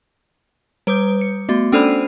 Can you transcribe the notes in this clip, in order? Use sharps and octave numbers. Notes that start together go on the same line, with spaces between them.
G3 B4 D6 D#6 G6
C#7
A3 B3 F#4
C#4 D4 A4 C5 D5 B5